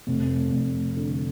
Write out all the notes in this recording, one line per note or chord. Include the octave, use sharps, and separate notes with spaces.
F1
F1
D3